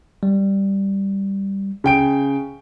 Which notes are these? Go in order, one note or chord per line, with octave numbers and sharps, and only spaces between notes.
G3
C#3 G5 D7